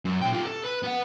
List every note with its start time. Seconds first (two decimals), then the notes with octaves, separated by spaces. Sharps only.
0.05 F#2
0.22 A#2 G5
0.34 F4 G4
0.47 A4
0.65 B4
0.84 B3 F#5